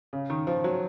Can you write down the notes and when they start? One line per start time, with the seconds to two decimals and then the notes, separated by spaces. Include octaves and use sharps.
0.13 C#3
0.30 D#3
0.47 F3
0.64 F#3